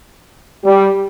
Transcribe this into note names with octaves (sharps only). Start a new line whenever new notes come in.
G3